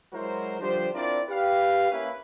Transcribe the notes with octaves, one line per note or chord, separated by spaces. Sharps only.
F#3 G#3 E4 F#4 A#4 C5
D3 F3 G3 D4 G4 C5
C4 D4 E4 F4 A#4 D5
G4 B4 F5
A#3 C#4 E4 B4